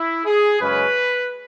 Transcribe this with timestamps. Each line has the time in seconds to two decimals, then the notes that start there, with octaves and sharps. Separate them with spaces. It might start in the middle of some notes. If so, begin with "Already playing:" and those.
Already playing: E4
0.25 G#4
0.60 F#2 C#3 G#3 C#4 B4